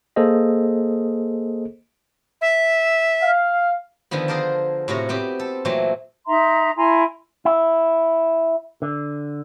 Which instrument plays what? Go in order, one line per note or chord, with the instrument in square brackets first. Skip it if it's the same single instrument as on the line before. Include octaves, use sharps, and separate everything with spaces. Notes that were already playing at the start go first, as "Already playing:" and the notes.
[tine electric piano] A#3 G#4 A4 C5 D#5
[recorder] E5
[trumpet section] F5
[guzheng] D3 D#3 F3 B3
G#4 A#4 C5 D5 A5
A2 C3 F#4 C#5 A#5
B3 C4 G4
A4
A#2 E3 F#3 A3 C4
[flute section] D#4 E5 A#5 C6
E4 G#5 A#5 C6
[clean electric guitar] E4
D3